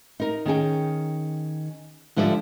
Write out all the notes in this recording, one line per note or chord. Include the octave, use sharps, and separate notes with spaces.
D#4 A#4
D#3 C#4 G#4 G5
G#2 D3 F3 G3 D5 E5